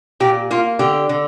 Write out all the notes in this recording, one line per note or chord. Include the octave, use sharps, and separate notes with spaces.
A#2 G4
A#3 F4
D3 G4
D3